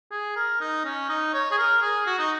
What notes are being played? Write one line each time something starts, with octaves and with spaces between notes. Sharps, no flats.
G#4
A#4
D#4
C#4
D#4
C#5
G#4
A#4
G#4
F#4
D#4